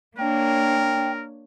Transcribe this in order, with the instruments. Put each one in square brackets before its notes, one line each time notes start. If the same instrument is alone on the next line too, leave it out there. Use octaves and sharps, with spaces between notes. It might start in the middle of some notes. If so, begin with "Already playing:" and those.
[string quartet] A#3 D4 C#5 [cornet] A#4 [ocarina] G5